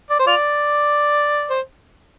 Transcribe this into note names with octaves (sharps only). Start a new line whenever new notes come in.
D5
C5
F4 D5
C5